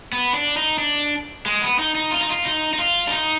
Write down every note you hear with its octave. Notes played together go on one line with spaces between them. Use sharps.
B3
D4
D#4
D4
G#3
B3
D#4
D#4
F4
D#4
F4
D#4
D#4
F4
D4
D#4